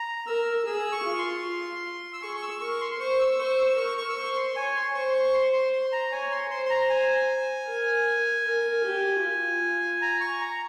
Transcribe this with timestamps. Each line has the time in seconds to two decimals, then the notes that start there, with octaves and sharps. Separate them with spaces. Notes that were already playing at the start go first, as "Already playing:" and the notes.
Already playing: A#5
0.27 A#4 E6
0.66 G#4 E6
0.92 C#6
1.05 F4
1.19 C6
2.13 E6
2.22 G#4 C#6
2.37 C#6
2.42 E6
2.61 A#4 C#6
2.81 C6
2.91 C6
3.00 C5 C#6
3.19 E6
3.39 C5 C#6
3.58 E6
3.77 A#4 C#6
3.98 C#6
4.09 E6
4.16 C5 C#6
4.36 C6
4.56 C#5 G#5
4.76 C6
4.94 C5 C#6
5.09 C6
5.14 C#6
5.34 C6
5.53 C6
5.73 C6
5.92 A#5
6.12 C#5 G#5
6.31 C6
6.51 C5 C6
6.66 C6
6.70 A#5
6.90 G#5
7.68 A#4
8.46 A#4
8.85 G4
9.24 F4
10.02 A#5
10.21 C#6
10.41 A#5